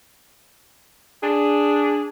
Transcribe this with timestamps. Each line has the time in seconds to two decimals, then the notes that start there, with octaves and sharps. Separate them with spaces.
1.23 D4 G#4